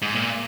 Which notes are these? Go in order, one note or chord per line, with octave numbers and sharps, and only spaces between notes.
G#2
A#2